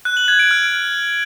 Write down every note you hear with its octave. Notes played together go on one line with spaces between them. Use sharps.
F#6
F#7
G#6
D7
F6